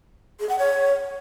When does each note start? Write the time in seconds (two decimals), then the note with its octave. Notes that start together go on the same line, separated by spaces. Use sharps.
0.40 G#4
0.49 F#5
0.59 C#5